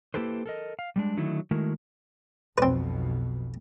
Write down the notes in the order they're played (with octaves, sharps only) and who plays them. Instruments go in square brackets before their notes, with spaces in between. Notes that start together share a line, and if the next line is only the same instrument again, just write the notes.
[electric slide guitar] A#3 E4 G4 A4 B4 C5
A4 A#4 D#5
F5
G3 G#3 D4
D3 D#3 F#3 A3 D#4 E4
D#3 G#3 A3 E4 F#4 A#4
[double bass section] B1 F2 B2 [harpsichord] C4 B4